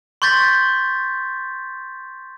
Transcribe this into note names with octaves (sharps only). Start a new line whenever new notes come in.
C6 C#6 G6 A6 B6